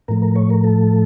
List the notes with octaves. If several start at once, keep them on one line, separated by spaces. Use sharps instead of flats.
A2 F3 A3 A#4
A#4
C#5
A#4
A4